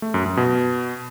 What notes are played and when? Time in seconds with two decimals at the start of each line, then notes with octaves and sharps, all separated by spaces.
0.02 A3
0.14 F#2
0.26 F#2
0.37 B2